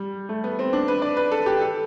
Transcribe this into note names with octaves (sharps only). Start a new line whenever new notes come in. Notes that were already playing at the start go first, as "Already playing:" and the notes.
Already playing: G3
A3
B3
C4
D4
B4
D5
B4
A4
G4
A4